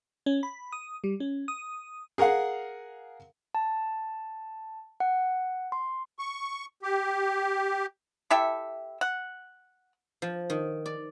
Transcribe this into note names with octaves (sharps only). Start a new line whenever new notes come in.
C#4
B5
D#6
G3
C#4
D#6
G#4 A#4 F5 F#5
A5
F#5
C6
C#6
G4
E4 G4 A4 E5
F#5
F3
D#3
D5